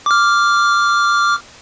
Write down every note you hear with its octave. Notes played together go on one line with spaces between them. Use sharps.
D6 F6